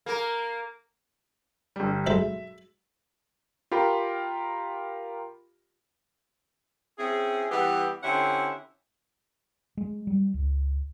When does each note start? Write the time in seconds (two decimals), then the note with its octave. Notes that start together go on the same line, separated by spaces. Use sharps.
0.06 A#3 A#4
1.76 G1 G3
2.07 B1 G#3 A4 E5
3.72 F4 G4 A#4 B5
6.98 C4 C#4 E4 G#4
7.51 E3 G3 B3 E4 G4
8.03 D3 C4 C#4 E4 G4 F#5
9.77 G#3
10.07 G3
10.34 C#2